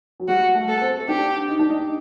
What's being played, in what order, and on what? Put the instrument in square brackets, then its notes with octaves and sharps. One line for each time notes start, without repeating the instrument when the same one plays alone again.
[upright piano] F#3
[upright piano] G3 [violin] F#4
[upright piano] A3
[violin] A4
[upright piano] C4
[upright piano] D4 [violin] G4
[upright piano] D#4
D4
D#4